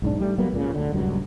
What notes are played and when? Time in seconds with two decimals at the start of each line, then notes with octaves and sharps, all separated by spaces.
0.02 B1 G#2 D4
0.20 G3 A3
0.38 F#3 G3 A#3 B3
0.53 C#2 A#2 C#3
0.75 D2 D3
0.92 D#1 C#2 G2 F#3